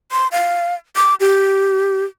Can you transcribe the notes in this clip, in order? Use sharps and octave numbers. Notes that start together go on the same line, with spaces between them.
C6
F5
D6
G4